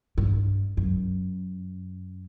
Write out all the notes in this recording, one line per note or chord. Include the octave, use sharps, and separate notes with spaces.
G2
F#2